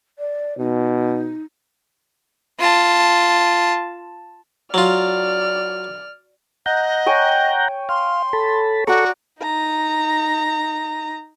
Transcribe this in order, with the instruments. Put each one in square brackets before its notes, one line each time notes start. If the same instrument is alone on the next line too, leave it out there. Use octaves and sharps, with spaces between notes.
[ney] D5
[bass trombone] B2 [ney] D#4
[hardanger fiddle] F4 A5
[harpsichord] F#3 F4 [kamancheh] D5 F6
[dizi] D#5 [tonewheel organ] F#5 A#5 G6
[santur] C#5 G5 G#5
[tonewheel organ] F5 [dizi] C6
[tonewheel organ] A4 A5 B5
[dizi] F#4 [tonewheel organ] A4 C#6 [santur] D5 A#5
[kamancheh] D#4 A#5